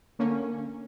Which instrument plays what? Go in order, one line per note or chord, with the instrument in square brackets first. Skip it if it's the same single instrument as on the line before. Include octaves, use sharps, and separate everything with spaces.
[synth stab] D3 A#3 C#4